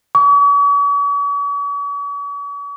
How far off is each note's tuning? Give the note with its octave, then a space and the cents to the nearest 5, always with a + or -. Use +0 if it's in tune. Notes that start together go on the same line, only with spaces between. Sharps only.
C#6 +45